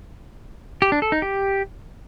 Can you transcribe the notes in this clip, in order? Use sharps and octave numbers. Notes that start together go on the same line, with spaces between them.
G4
D4
A4
D#4
G4